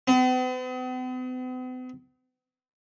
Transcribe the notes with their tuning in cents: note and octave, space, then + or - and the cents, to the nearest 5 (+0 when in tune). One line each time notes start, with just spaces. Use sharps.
B3 +45